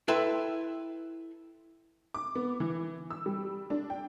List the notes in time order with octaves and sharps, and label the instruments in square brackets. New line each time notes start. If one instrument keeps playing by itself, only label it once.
[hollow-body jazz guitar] E4 A4 B4 E5 G5 C6
[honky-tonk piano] D6
B3
E3
E6
G3
D4
G5